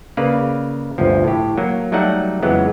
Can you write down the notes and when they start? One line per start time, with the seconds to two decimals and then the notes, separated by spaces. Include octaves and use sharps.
0.17 C#3 A#3 B4 D5 F5
0.98 G1 D2 F3
1.24 A2 G4
1.58 F#3 A#3
1.92 F#3 G3 A3 D#4 F#5
2.43 F2 C#3 E3 F#3 G#3 B3